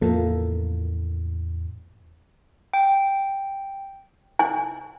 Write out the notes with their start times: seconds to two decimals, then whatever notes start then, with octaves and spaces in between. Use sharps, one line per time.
0.02 E2 A2 F3 A#3 A4
2.74 G5
4.39 G#5